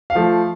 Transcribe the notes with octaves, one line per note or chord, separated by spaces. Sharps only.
F5
F3 A3